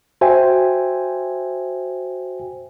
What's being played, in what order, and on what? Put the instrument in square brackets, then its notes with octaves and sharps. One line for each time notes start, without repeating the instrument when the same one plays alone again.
[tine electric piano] F#4 C5 E5 G5 G#5